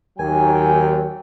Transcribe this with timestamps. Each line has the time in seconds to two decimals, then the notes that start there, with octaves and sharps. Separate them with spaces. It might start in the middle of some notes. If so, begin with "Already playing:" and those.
0.19 D#2 F#3 G5 G#5